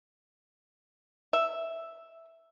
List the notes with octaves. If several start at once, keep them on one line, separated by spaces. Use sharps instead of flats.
E5